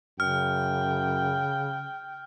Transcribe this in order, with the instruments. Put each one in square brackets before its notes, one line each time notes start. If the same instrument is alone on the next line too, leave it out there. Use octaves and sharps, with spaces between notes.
[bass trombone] F#2 [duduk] C#3 [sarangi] G5 [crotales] F6